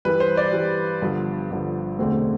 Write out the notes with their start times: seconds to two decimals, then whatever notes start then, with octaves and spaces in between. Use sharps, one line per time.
0.05 G2 E3 G3 B4
0.20 C5
0.37 D5
0.52 G2 E3 G3
1.01 G1 G2 D3 F3
1.50 G1 G2 D3 F3
1.99 E1 D2 D3 A3 C4